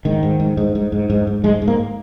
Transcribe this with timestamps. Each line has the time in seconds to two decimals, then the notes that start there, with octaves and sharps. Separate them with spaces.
0.05 G#2 D#3
0.23 G#2
0.40 G#2
0.57 G#2
0.75 G#2
0.92 G#2
1.10 G#2
1.27 G#2
1.44 G#2 G#3
1.62 G#2
1.68 A#3